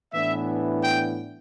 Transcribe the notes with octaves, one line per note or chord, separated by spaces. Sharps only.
A2 E3 B3 D4 E5
G5